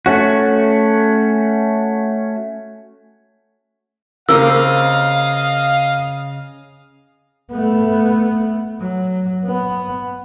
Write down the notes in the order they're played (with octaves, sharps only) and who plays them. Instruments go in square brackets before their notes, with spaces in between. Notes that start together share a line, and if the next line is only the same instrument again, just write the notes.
[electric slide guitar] A3 C#4 F#4
[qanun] C#3 C4 G4 [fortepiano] A#3 A#4 [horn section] D#5 F5 [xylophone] E6
[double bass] A3 B3
F#3
B3